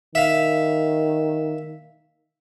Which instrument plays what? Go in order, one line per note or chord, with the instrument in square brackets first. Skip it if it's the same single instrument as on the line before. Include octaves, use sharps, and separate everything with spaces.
[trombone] D#3 [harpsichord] E5 F5